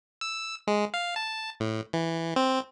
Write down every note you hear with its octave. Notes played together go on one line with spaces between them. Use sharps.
E6
G#3
F5
A5
A2
E3
C4